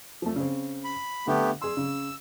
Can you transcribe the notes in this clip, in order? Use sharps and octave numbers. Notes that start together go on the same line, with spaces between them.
F3 A3
C#3 C4
B5
D3 A3 B3 G4
G#4 C6 E6
C#3